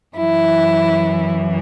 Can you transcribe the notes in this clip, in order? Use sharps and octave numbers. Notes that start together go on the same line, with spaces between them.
F#2 E3 E4